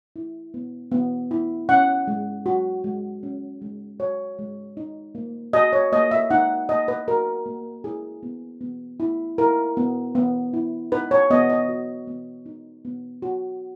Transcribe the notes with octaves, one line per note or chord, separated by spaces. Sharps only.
E4
B3
B3
E4
C#4 F#5
G#3
F#4
G#3
C#4
G#3
F#4 C#5
G#3
D#4
A#3
F#4 D#5
C#5
A#3 D#5
E5
D#4 F#5
A#3 D#5
B4
F#4 A#4
A#3
E4 G#4
B3
B3
E4
E4 A#4
B3
B3
E4
D#4 B4
C#5
B3 D#5
D#5
F#4
B3
D#4
B3
F#4